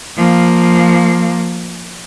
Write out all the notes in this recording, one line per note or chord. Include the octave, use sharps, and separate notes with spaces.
F3 A#3